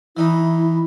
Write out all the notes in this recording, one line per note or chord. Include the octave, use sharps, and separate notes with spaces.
E3 D#4 E4